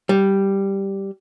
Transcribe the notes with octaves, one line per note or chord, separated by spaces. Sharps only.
G3